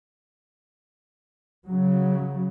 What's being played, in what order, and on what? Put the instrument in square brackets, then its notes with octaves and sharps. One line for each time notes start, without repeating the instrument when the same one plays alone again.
[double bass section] C#3 F#3